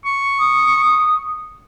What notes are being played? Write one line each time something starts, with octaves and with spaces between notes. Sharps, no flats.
C#6
D#6